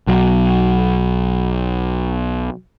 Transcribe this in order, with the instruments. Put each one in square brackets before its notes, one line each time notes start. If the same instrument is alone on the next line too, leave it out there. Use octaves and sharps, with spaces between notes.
[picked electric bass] B1 F#3